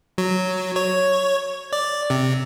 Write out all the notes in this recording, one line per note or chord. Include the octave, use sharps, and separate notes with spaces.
F#3
C#5
D5
C3